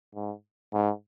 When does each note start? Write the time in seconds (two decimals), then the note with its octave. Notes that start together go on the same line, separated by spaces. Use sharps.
0.15 G#2
0.73 G#2